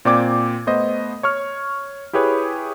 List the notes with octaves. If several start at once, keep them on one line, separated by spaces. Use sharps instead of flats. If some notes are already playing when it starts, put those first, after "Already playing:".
A#2 C4 D5 G5 D6 G#6
A3 B3 C5 D#5
C#5 C#6 F6
E4 G4 G#4 B4 C#5